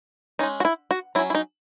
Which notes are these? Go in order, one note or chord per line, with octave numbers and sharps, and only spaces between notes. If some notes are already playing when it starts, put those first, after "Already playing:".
G#3 C#4 D#4
F#4
E4
F#4
F#3 C#4 E4
E4
D#4